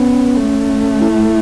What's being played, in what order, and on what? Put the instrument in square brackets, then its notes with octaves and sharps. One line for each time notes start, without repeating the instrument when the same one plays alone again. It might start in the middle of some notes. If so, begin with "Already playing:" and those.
Already playing: [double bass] B3 [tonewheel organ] C#4
[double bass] A3
[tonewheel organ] E4